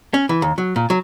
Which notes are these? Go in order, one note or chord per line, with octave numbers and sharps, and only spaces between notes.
C#4
E3
D#2
F#3
A#2
F#3